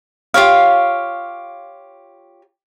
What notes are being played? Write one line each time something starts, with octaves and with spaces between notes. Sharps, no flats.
F4 G4 C#5 F5